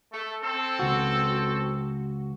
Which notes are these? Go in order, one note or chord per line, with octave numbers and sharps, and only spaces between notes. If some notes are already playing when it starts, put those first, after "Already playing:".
A3 A4
C4 A4
C#2 F#4